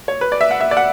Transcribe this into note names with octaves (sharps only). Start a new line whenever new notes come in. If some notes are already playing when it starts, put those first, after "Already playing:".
C#5
B4
D5
E5
F#5
E5
D5
F#5